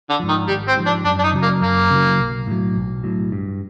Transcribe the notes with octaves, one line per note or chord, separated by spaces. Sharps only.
D3
G#2 F3
D#3
G#1 G3
C4
G#2 F3
D4
F#2 D4
D4
D#4
C#3 F#3
A#3
F#2 A#3
C#3 F#3
B1
A2 F#3
B1
A2 F#3
G2